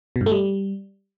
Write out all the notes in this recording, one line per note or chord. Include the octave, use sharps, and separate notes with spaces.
B2
G2
A3
G3